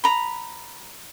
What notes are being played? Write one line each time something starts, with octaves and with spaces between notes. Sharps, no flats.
A#5 B5